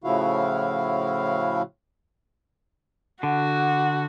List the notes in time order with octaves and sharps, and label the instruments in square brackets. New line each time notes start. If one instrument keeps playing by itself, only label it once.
[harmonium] A2 C#3 F3 E4 F#4 F5
[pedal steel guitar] D3 [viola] F#4 [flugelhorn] F#5